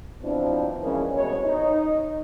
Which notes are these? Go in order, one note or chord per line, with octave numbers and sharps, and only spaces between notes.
B2 F3 F#3 C4 D4 E4
C#3 E3 F3 G#3 A#3 C#4
C2 B2 G#3 C#5
D#4